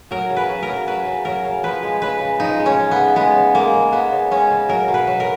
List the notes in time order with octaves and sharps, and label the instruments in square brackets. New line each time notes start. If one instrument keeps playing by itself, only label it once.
[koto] F#3 A#4
C#3
B4
F#3
A#4
C#3
F#3 B4
C#3
F#3 A#4
C#3
F3 B4
G#3
C#3 B4
C#3
F3 D#4
G#3
C#4
C#3
B3
C#3
G#3 B3
C#3
G#3 A#3
C#3
G#3 B3
C#3
G#3 C#4
C#3
F#3 A#4
B2
B4
F#3
A#4